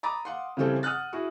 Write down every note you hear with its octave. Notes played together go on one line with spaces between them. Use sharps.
A#5 B5 D6 D#6 A6
F5 F#5 C6
C#3 E3 G3 C4 C#4 A4
F#5 D#6 F6 F#6 A6
E4 F#4 G#4